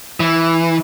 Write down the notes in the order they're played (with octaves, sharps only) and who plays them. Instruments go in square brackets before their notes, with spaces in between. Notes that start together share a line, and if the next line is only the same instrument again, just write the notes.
[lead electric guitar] E3